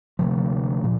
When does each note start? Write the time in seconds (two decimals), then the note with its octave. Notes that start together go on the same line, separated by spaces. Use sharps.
0.19 D2 C3 F3
0.84 A#2